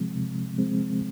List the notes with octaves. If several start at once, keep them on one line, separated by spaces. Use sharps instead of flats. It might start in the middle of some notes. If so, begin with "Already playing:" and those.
Already playing: C3 F3 G#3 C4
C3
F3 G#3 C4